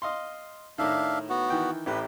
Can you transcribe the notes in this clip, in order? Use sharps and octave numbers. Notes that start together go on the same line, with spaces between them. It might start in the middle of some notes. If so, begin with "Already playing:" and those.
D#5 F5 C6
A2 D#3 D4 E5 F5
B3 F#4
D#3 E3 G5
A1 A2 G4 B4